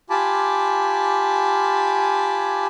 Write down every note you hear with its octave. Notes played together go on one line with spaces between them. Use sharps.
F4 G4 G#5 A5 B5 D6